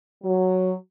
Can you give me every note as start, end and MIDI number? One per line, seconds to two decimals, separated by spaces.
0.24 0.72 54